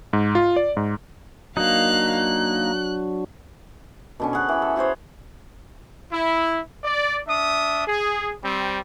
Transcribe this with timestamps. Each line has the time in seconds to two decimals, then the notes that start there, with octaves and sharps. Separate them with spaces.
0.13 G#2
0.35 F4
0.56 D5
0.77 G#2
1.57 F#3 A#3 D4 D#4 F#4 F5 F#6
2.17 F#6
4.20 B2 D3 C#4
4.33 G#4 F#5
4.49 E3 B5
4.62 A4
4.76 F#4 G#4 C5 C#5
6.10 E4
6.83 D5
7.27 D4 E5 D#6
7.86 G#4
8.43 G3 C4